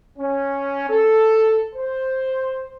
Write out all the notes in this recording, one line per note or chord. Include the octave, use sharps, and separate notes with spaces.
C#4
A4
C5